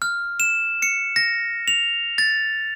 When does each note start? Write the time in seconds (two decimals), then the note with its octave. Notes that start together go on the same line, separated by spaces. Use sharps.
0.02 F6
0.40 E7
0.82 C#7
1.16 A#6
1.68 F7
2.18 A6